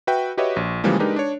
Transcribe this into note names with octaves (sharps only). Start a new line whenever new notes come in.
F#4 B4 E5 G5
F#4 G4 B4 C#5 D#5 E5
A#1
C#3 E3 F3 G3 G#3 A#3
G#3 D4 D#4 G4 A#4 B4
D4 C#5